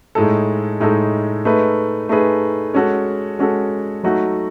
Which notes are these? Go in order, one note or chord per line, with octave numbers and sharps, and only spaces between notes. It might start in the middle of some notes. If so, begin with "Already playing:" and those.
A2 G#3 D#4 A4
A2 G#3 D#4 A4
A3 D#4 G#4 B4
A3 D#4 G#4 B4
G#3 C#4 F#4 A4
G#3 C#4 F#4 A4
F#3 A3 D#4 F#4